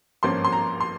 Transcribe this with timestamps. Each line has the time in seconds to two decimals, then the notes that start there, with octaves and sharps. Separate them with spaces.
0.23 G#1 G2 F3 A#3 C#4 C6
0.44 C6
0.52 A#5
0.81 C6